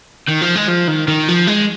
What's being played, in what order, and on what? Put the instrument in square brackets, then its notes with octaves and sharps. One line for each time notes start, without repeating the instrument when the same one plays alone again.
[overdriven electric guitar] D#3
F3
G#3
F3
D#3
D#3
F3
G#3